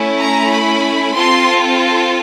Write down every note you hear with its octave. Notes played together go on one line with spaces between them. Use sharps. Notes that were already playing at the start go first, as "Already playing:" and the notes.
Already playing: A3 C#4 E4
A#5
B5
C4 F4 A4 C6